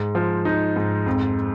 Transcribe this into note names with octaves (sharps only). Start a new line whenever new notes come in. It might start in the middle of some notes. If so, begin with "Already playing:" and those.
Already playing: G#2
F3
D#4
G#2
F2